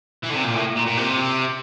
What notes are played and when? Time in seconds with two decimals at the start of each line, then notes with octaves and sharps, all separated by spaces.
0.24 E3
0.30 D3
0.34 C3
0.45 A#2
0.55 A2
0.76 A#2
0.87 A#2
0.97 C3